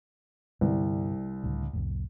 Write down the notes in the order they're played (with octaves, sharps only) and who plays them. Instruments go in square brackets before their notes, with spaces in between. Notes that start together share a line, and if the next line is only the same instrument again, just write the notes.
[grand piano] C2 [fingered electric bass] G2 D3 B3
[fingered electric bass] C#2 A2 D3
C2 F2 A2